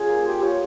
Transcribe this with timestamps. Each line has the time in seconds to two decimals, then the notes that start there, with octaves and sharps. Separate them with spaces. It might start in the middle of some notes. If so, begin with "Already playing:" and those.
Already playing: C#4 F4 G#4
0.09 A#3
0.26 G4 C5
0.42 F4 C#5